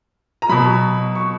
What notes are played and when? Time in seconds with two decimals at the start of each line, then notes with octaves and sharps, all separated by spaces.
0.42 A#5
0.49 B2 F#3 B5
1.15 C#6